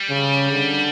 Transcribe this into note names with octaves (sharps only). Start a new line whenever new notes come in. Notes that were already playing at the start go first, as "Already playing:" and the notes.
Already playing: G3
C#3
D3